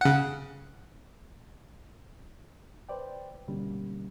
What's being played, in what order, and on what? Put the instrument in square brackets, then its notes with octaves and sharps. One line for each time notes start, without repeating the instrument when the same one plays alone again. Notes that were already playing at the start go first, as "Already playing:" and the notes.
[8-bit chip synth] C#3 F#5
[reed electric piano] B4 C5 D5 G5
G2 B2 D3 G3 A#3 C#4